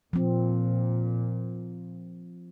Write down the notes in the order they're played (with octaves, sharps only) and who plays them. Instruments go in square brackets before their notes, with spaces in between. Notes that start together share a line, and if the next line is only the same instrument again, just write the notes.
[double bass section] A#2 [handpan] F3 C4